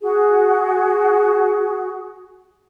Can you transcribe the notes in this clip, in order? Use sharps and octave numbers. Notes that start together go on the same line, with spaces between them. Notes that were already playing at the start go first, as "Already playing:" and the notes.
F#4 G#4